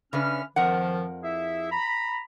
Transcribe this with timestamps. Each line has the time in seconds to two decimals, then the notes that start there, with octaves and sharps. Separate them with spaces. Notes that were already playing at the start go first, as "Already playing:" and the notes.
0.13 C#3 C#4 D4 B4 E5 F6
0.56 F2 D#3 F3 A#4 F#5
1.23 E4 G#4 E5
1.72 A#5 B5